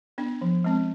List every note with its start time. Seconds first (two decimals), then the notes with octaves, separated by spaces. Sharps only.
0.18 B3 D4
0.41 F3
0.64 G#3 C4